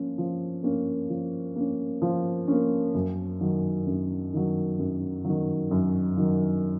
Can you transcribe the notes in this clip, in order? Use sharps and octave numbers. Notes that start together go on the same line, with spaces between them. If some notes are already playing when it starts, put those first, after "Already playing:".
Already playing: F3 A#3 C#4
F3
A#3 C#4
F3
A#3 C#4
F3
A#3 C#4
F#2
D#3 F#3
F#2
D#3 F#3
F#2
D#3 F#3
F#2
D#3 F#3